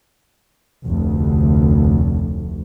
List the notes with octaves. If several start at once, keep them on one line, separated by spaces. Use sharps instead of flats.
F1 D2